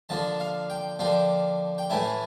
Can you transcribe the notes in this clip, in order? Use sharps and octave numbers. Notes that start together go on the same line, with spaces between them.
D3 F3 A#3 D4 A5
F5
G5
D3 F3 A#3 D4 G5
G5
A2 E3 A3 C#4 E4 A5